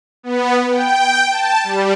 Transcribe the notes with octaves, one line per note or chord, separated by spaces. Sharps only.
B3
G5
A5
G3